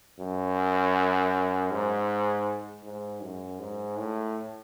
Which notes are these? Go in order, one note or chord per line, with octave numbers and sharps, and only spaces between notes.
F#2
G#2
G#2
F#2
G#2
A2